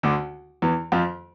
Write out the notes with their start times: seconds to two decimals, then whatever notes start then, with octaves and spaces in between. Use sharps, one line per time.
0.03 D2 D3
0.62 E2 E3
0.92 F2 F3